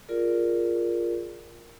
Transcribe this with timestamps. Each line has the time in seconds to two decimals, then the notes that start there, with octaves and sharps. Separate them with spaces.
0.09 F4 G#4 A#4 D5